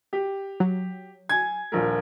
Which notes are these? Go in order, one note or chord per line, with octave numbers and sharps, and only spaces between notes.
G4
F#3
G#5 G#6
D#1 A#1 A#4